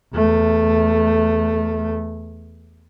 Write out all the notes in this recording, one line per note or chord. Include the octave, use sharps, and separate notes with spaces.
E2 A3